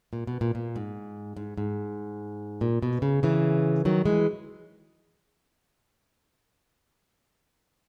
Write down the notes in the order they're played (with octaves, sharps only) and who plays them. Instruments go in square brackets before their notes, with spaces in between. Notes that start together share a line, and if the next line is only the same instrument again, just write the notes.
[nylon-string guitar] A#2
B2
A#2
A#2
G#2
G#2
G#2
A#2
B2
C#3
C#3 E3
D#3 F#3
E3 G#3